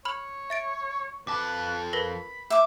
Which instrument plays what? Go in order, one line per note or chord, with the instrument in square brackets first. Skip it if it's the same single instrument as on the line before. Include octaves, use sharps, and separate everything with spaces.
[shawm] C#5 [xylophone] B5 F6 F#7
[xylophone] E5 A6 D7
[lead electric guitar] F2 A5 [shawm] B4 [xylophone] D6
[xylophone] A#4 B4 A#6 [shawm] B5
[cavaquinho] E5 D6